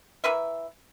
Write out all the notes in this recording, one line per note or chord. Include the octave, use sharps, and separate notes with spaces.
E3 A#4 B4 E5